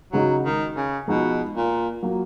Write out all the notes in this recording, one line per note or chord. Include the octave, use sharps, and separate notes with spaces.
C#3 F#3 G#3 D#4 F#4
D#3
C#3
B2 F3 G#3 D#4 F#4
A#2
F#3 A#3 F4